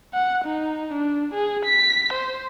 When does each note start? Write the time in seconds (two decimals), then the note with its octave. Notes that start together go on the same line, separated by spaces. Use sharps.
0.14 F#5
0.45 D#4
0.93 D4
1.34 G#4
1.66 B6
2.13 C5